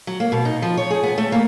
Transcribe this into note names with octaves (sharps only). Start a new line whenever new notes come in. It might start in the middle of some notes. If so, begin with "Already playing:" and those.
F#3
A#3
B2
D#4
F3
C#5
G#4
B3
A3
A#3